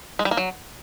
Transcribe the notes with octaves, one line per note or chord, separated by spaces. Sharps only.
G#3
G3
A#3
F#3